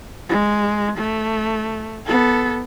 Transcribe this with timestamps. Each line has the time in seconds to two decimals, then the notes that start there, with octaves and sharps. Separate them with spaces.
0.29 G#3
0.98 A3
2.06 B3 A4